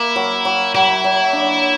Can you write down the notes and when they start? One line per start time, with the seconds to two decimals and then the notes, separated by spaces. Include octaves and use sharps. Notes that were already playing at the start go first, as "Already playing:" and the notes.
Already playing: A#3 E4
0.16 F#3
0.45 F#3
0.74 F#3 E4
1.04 F#3
1.33 D4